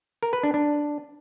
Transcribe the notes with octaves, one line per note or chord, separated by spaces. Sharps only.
A#4
B4
D4
D4